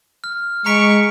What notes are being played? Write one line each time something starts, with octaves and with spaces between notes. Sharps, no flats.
F6
G#3 A#5 C#6 B6 D7